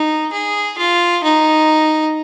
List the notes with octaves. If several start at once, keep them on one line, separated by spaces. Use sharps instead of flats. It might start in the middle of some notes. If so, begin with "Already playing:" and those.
Already playing: D#4
G#4
F4
D#4